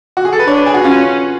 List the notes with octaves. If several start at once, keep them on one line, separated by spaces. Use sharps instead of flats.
F#4
G#4
A4
B4
D4 C#5
B4
G#4
F#4
C#4 F4